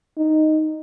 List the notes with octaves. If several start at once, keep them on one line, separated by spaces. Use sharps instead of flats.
D#4